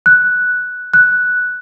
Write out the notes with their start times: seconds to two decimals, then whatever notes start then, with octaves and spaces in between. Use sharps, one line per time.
0.06 F#6
0.94 F#6